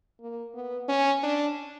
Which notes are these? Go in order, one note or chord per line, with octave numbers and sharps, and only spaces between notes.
A#3
B3
C#4
D4